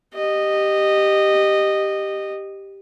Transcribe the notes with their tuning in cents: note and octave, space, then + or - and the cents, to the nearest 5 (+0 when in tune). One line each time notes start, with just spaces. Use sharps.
G4 +0 D#5 -15